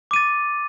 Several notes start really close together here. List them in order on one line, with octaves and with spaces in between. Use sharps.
D6 D#7 A6